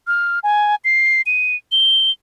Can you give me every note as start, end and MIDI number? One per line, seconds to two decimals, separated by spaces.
0.07 0.39 89
0.43 0.75 80
0.84 1.21 96
1.26 1.56 99
1.72 2.11 103